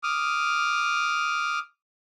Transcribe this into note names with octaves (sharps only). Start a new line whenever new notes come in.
D6 D#6 F6